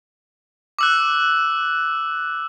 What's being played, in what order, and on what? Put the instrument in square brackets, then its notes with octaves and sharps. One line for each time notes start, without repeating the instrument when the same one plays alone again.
[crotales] D6 E6 F#6